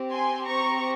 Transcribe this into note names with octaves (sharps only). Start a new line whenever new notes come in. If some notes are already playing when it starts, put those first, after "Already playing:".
Already playing: C4 G4
G#5 C6
A#5 C#6